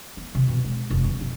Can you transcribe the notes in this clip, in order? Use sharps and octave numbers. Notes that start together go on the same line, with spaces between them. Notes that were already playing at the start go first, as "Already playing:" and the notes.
B3
C3
B2
G#3
F1
F2
B1